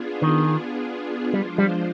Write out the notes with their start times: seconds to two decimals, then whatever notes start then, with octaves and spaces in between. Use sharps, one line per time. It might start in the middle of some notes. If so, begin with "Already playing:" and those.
Already playing: B3 D4 F4 G#4
0.22 D#3
1.33 F3 G3 G#3 D4 F4 C5
1.58 G3